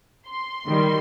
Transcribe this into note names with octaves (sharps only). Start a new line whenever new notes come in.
C6
D#3 G3